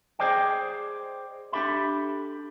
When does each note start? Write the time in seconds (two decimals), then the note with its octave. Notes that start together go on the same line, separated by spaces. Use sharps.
0.19 G#4 B4 C5 D5 D#5 G5
1.52 D4 G4 A4 E5 B5